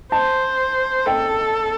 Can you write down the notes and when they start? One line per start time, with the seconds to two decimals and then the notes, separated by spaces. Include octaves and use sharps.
0.12 C5 A5
1.06 A4 G5